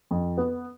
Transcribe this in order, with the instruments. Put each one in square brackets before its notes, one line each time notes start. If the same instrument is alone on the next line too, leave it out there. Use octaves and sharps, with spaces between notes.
[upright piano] F2
B3